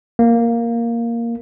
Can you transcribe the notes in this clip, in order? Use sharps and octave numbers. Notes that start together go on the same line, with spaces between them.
A#3